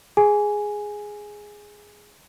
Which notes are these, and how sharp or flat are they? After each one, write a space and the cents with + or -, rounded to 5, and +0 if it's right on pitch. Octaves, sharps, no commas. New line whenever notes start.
G#4 +0 G#5 +0